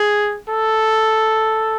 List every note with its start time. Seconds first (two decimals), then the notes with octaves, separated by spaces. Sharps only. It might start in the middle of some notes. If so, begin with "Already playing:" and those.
Already playing: G#4
0.49 A4